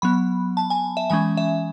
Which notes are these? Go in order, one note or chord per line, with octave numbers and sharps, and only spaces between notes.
F#3 B3 B5
A5
G#5
E5
E3 G#3 C#4 G#5
E5